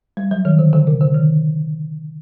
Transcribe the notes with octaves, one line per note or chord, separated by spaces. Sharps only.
G3
F#3
D#3
D3
D3
C3
D3
D#3